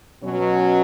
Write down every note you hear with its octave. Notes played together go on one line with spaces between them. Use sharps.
B2 F#3 C#4